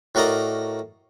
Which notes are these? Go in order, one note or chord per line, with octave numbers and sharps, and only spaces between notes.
A2 F#4 A#4 D5 D#5 A#5